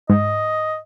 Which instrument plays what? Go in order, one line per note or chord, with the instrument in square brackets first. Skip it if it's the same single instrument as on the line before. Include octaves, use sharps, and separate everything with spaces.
[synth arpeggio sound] G#2 [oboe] D#5